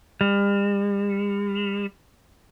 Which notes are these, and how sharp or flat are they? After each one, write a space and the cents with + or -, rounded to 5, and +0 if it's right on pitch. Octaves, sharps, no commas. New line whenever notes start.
G3 +45